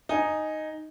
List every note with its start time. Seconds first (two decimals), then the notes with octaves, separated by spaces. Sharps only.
0.09 D#4 G#5